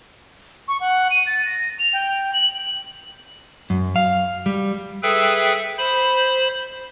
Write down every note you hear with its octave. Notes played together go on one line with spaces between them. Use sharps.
C#6
F#5
D#7
A6
A#6
F7
G5
F#7
F#2
F5
G3
G#4 A4 B4 E5 G5
C5 B5